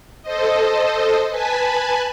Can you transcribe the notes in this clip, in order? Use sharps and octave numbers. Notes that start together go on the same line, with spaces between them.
A4 C5 D#5
B4 G#5 A5 B5